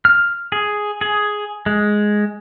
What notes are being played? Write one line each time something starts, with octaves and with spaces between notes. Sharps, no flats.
F6
G#4
G#4
G#3